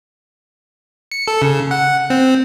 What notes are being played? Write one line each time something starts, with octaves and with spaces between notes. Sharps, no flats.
C#7
A4
C#3
F#5
C4